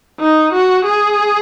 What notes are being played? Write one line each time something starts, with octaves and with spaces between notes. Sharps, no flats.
D#4
F#4
G#4